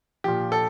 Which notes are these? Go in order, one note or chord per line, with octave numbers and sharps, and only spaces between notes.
A#2 F3 G4
A4